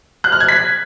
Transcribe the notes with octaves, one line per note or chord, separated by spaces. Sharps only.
F#6
F6
G#6
B6